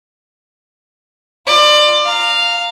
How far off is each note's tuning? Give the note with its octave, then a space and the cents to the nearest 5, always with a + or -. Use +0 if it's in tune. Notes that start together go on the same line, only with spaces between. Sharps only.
F4 +0 D5 +25
F5 +0 A#5 -20